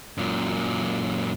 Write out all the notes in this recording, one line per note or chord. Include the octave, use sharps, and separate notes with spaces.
F#2 A#2